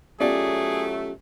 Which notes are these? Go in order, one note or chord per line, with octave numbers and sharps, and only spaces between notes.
B2 F#3 A3 C#4 F4 G4 G#4 D5